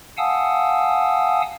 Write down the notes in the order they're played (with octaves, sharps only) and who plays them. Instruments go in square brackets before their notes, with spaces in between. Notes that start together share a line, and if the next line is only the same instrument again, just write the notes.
[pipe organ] F5 F#5 G#5 A5 D#6 E6